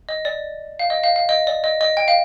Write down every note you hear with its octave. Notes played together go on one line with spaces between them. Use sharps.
D#5
D5
F5
D#5
F5
F5
D#5
D5
D#5
D#5
G5
F5